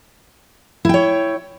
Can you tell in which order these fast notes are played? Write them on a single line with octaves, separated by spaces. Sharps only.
E4 G5 C#5